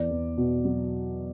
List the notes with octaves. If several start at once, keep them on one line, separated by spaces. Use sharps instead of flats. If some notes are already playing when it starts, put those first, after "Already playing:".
Already playing: E2 E3 D5
E2
B2
F#3